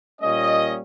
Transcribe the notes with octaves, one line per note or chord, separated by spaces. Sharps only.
A#2 G3 A#3 C#4 D#5